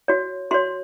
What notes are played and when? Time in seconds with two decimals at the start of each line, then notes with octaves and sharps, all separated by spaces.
0.08 F#4 C#5
0.51 F#4 C#5 C6